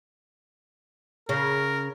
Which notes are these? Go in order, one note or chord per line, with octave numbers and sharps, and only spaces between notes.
C#3 A#4